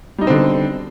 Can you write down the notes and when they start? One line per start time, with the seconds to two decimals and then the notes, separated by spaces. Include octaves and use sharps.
0.18 G3
0.21 D#4
0.24 B2
0.27 C4
0.30 D3